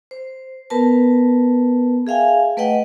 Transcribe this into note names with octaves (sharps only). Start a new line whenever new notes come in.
C5
B3 A#4 B4 A5
G#4 E5 F5 G5 G#5
A3 B4 D#5 F#5 G5